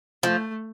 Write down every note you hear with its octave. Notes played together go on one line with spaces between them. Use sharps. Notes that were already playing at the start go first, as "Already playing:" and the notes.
F3 A3